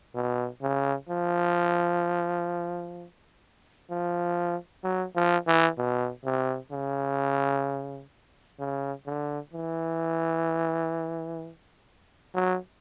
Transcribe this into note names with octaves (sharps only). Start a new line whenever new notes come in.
B2
C#3
F3
F3
F#3
F3
E3
B2
C3
C#3
C#3
D3
E3
F#3